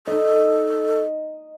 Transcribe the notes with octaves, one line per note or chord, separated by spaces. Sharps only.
D#4 A4 D#5